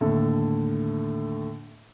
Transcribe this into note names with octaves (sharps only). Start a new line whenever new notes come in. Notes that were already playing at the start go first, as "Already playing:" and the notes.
D#2 A2 D3 A4